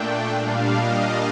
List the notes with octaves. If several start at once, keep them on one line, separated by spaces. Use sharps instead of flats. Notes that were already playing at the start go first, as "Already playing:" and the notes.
Already playing: A#2 A3 D4 G5
A#2 G3 D4 F5
D#5